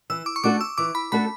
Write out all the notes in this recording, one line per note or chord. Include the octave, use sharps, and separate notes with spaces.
E3 E6
D6
C#6
A3 D4 F#4 A4 D6
E6
E3 D6
B5
A3 D4 F#4 A4 B5